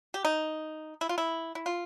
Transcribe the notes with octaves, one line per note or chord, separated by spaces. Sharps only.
G4
D#4
E4
F4
E4
E4
F4